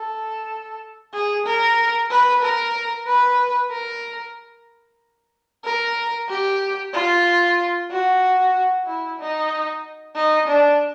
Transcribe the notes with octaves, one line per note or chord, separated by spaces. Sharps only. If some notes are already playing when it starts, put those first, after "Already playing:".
Already playing: A4
G#4
A#4
B4
A#4
B4
A#4
A#4
G4
F4
F#4
E4
D#4
D#4
D4